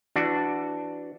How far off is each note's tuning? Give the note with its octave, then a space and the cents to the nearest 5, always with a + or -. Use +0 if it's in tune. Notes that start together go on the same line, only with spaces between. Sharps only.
E3 +15 D4 +0 F#4 +0